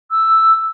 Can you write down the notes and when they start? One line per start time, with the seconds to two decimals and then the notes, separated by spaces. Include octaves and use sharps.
0.11 E6